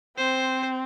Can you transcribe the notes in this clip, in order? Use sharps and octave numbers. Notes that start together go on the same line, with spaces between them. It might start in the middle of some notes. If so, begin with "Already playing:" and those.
C4 C5